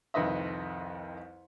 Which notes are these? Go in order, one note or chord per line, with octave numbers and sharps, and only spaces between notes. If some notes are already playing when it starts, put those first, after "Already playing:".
C2 F2 D#3 B4 D#5 E5